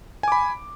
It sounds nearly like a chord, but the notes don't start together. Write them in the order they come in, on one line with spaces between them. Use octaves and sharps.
G#5 D6 B5